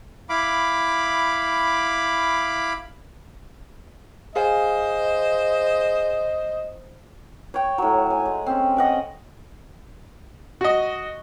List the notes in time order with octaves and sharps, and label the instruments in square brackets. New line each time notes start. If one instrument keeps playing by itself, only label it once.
[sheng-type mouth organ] E4 F5 B5 D6
[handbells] G#4 F5 G#5 [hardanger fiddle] C5 [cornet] D#5
[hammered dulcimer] C#5 G5
A2 F#3
G#5
G#3
C4 C#4
D#5 F#5 G5
[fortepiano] F#4 D#5